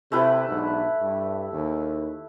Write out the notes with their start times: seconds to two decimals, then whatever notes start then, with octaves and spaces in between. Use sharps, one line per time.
0.12 C3 A3 E4 B4
0.49 B1 G#2 D4
1.01 G2
1.53 D#2